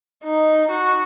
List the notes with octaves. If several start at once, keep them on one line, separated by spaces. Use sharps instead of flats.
D#4
F#4